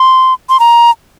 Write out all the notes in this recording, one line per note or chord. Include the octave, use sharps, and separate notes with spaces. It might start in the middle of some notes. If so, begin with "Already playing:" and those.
Already playing: C6
C6
A#5